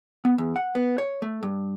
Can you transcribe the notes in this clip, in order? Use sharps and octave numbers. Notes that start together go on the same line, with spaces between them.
B3
E2
F#5
B3
C#5
A3
G2